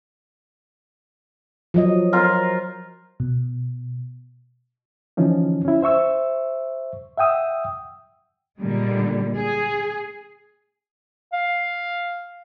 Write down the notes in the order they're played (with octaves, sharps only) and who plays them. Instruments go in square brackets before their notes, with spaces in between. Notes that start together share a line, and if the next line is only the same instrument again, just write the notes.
[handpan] F3 F#3 D#5
[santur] F4 A#4 C5
[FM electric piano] B2
[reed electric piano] D3 E3 F3 C#4 D#4
C#4 E4
C5 E5 C#6 E6
E5 F#5 G5 D#6 E6
[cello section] A#2 D3 G3 G#3
G#4
[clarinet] F5